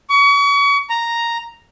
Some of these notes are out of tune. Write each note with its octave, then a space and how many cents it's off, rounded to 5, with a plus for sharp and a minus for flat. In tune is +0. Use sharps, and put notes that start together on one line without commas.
C#6 +35
A#5 +0